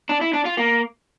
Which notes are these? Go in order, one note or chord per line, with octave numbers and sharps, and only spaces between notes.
D4
E4
D4
F4
A#3